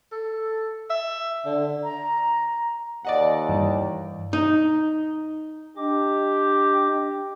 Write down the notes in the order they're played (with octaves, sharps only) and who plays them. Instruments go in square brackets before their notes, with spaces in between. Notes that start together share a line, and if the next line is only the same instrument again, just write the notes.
[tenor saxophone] A4
E5
D3
[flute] A#5
[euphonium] D#2 [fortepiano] D5 D#5 F#5
[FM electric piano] G2 E3
[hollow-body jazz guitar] D#4
[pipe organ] D4 D#5 D6 [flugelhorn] G4